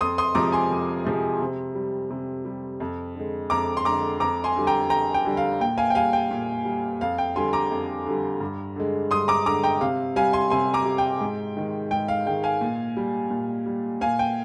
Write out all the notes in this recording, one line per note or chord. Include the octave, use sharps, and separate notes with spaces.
F2 C6 D#6
C6 D#6
C3 F3 G#3 A#5 D6
G#5 C6
F2
C3 F3 G#3
C3
G3
C3
G3
F2
D3 G#3
F2 A#5 D6
C6
D3 G#3 A#5 D6
F2 A#5 D6
G#5 C6
D3 G3
G5 A#5
F2 G5 A#5
G5
D3 G3
F5
A#2 G5
F5 G#5
G5
G3 F5 G#5
G5
A#2
G3
F2 F5
G5
D3 G3 G#5 C6
A#5 D6
F2
D3 G3
G2
D3 G#3
G2 C6 D#6
A#5 D6
D3 G#3 A#5 D6
G5 A#5
C3 F5
G3 F5 G#5
G#5 C6
C3 G#5 C6
A#5 D6
G3
G5
G#2
D#3 G#3
G#2 G5
F5
D#3 G#3 G5
F5 G#5
A#2
G3
A#2
G3
A#2 F5 G#5
G5